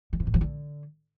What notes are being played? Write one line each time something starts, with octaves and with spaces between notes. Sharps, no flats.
D#3
C3
A2
F3
D3